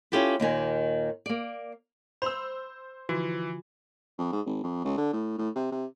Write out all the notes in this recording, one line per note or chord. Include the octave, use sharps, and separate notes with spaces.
C#4 E4 F4 G4 A4 B4
D#2 A#2 D#3 G#5
A#3 D5
C5 B5 C6 E6
D3 E3 F3 F4 F#4
F2
G#2
G#1
F2
C#2
D3
A2
A2
C3
C3